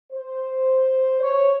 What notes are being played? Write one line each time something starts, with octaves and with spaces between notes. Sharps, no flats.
C5
C#5